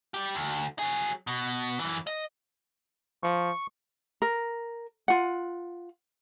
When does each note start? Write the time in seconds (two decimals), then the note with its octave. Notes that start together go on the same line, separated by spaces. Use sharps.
0.14 G3 G4
0.35 D2
0.79 F#3 G#4
1.27 B2
1.80 F#2 E3
2.07 D#5
3.23 F3 C#6
4.22 A#4
5.08 F4 F#5